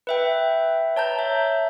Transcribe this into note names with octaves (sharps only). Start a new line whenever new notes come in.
B4 E5 G5
C#5 A5 A#5 G6
E5